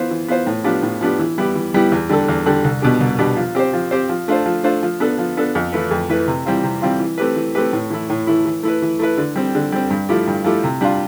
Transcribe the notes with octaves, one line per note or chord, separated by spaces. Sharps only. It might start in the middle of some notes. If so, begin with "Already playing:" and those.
Already playing: E3 B3 F4 C5
E3
B3 F4 C5
A2
F3 B3 D4 G4
A2
F3 B3 D4 G4
E3
G3 B3 E4 G4
E3
G3 B3 E4 G4
E2
D3 G3 D4 A4
E2
D3 G3 D4 A4
C2
B2 B3 D4 G4
C2
B2 B3 D4 G4
F3
C4 G4 C5
F3
C4 G4 C5
F3
A3 D4 F4 C5
F3
A3 D4 F4 C5
F3
B3 D4 A4
F3
B3 D4 A4
F2
E3 A3 E4 B4
F2
E3 A3 E4 B4
C3
E3 G3 C4 F4
C3
E3 G3 C4 F4
E3
A3 C4 G4 B4
E3
A3 C4 G4 B4
A2
E3 A3 E4
A2
E3 A3 E4
E3
A3 E4 B4
E3
A3 E4 B4
D3
G3 C4
D3
G3 C4
G2
F3 A3 E4 G4
G2
F3 A3 E4 G4
C3
G3 D4 F4